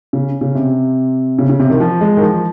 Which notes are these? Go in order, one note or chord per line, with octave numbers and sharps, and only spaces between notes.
C#3
C#3
C3
C#3
C#3
C3
D#3
F3
G#3
D#3
F3